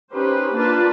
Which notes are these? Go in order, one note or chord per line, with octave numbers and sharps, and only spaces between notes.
C#4 D#4 G4 B4 C5
A#3 D4 F4 B4 A5